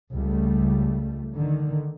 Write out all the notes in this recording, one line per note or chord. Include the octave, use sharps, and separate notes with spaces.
C#2 G3 A3
D3 D#3